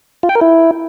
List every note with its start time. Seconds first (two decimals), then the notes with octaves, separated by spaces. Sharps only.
0.23 F4
0.29 G5
0.35 A#4
0.41 E4